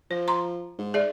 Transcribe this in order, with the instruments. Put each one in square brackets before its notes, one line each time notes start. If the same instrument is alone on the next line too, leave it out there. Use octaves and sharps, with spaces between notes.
[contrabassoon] F3 [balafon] C5
[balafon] A#5 C6
[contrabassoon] G#2
[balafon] G#4 D5 E5